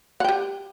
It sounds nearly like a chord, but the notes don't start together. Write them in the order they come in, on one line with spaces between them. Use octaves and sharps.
F#5 G5 G4